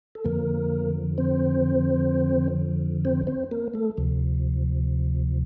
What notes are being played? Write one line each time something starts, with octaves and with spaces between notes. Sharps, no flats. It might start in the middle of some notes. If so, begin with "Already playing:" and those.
A4
F2 D3 F3 A#3 A#4
C4 C5
C4 C5
C4 C5
A#3 A#4
A3 A4
D2 C3 F3